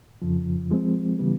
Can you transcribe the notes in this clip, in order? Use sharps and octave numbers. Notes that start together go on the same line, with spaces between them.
F2 C#3 F3
F3 G#3 C4
C#3 E3 G3 B3